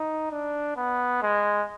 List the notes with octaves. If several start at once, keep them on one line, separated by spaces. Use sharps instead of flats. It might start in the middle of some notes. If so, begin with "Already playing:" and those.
Already playing: D#4
D4
B3
G#3